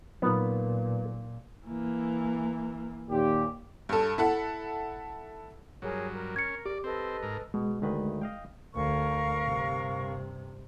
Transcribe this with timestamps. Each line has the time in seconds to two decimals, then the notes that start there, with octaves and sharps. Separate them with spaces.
0.22 A#2 F#3 B3 D#4 F4 A#4
1.67 E3 A#3
3.10 D#2 A#2 G4
3.89 G2 A4
4.18 E4 A4 F#5
5.82 G2 F#3 G#4 A#4 C#5
6.12 A#4
6.36 C#4 G#6 C#7
6.65 G4 D5
6.84 C4 A4 B4 D#5
7.23 G#2 A#4
7.54 B2 G#3
7.82 D2 D#3 B4
8.22 D#5 F5 G5
8.75 D2 A#4 F5 C#6
9.41 G2 C3